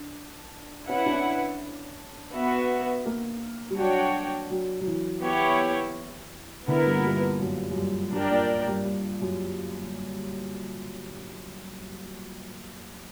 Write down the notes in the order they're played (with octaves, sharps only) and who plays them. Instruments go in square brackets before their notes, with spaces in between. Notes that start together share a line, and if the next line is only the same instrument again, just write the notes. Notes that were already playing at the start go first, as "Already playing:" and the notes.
Already playing: [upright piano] D4
[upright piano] C#4 [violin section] E4 B4 F#5
[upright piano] D4
C#4
[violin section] B3 F#4 B4 E5
[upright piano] A#3
G3
[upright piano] F#3 [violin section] D4 F#4 C#5 G5
[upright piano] F#3
F#3
E3
[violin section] B3 E4 G4 C#5
[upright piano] D3 [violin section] B3 E4 A#4
[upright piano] G2
A#2
G2
F#2
F#2
G2
[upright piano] G2 [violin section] D4 A#4 D5 G5
[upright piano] A#2
G2
G2
F#2